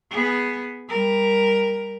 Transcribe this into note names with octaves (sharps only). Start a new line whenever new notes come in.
B3 G#4
G3 A#4